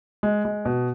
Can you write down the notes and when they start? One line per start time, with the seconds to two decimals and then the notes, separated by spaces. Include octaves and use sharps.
0.23 G#3
0.45 G#3
0.65 B2